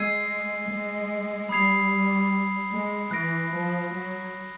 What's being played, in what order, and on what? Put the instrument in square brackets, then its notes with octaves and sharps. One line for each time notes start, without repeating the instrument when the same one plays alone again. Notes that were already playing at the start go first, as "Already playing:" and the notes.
Already playing: [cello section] G#3 [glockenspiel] E6 G#6 C7 D#7
[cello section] G#3
[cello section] G3 [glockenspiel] B5 D#6 G#6 C7 F7
[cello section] G#3
[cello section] E3 [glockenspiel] F#6 A#6 D7
[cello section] F3
F#3